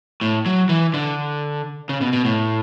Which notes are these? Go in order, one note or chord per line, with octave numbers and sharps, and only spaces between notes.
A2
F#3
E3
D3
C#3
B2
B2
A2